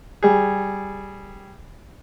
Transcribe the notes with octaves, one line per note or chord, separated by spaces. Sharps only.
G3 G#4